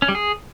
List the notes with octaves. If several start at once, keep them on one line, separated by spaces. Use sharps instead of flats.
C#4
G3
G#4